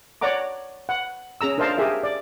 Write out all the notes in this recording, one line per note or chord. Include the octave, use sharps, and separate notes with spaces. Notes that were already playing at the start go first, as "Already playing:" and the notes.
C#5 D5 F#5 A#5 D6
F#5
C#4 G#4 A#5 E6
D4 A#4 C5 D#5 F5 A5
G4 G#4 A#4 E5
D5